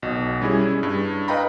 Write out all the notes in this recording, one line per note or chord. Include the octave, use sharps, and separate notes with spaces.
B1 B2 D#5
G3 C#4 E4 G#4
G2
B4 D#5 F5 G5 A#5 B5